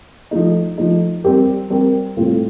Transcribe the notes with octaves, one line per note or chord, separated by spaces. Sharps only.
F3 A3 D#4
F3 A3 D#4
G3 C4 G4 A#4
G3 C4 G4 A#4
A2 G3 C4 F4 A4